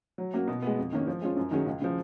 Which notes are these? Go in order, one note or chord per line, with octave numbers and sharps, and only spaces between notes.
F#3
A#3 C#4 F#4
B2
G#3 B3
F2
D#3 A#3 C#4
F3
G#3 C#4 F4
F#2
D#3 F#3 C#4 G#4
C#2
C#3 F3